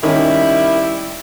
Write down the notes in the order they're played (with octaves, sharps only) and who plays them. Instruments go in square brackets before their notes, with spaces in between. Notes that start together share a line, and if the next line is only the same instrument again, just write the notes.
[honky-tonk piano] D#3 C#4 [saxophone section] G3 E4